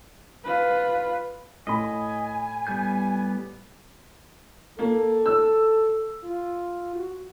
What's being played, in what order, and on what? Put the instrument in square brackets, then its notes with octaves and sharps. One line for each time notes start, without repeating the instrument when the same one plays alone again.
[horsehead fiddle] F4 B4
[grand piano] A2 B5 [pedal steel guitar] D#5 [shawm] G#5
[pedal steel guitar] G3 B3 G6
[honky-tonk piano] A#3 [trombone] A4
[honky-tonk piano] E6
[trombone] F4
F#4